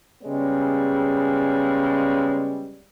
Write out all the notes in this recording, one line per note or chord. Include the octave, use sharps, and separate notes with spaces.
C#3 G3 G#3 B3 C#5